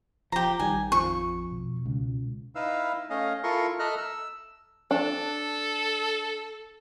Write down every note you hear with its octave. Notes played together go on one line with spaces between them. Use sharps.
D#1 F3 G4 A#5
A1 D#3 G3 G#5
F2 F3 C#6
B2
C#2
D#4 E4 B4 F5 E6
A3 C#4 D#5 F5
E4 F4 A4 A#4 C6 C#6
A4 D#5 E5 A#5 F6 F#6
E6
D4 A4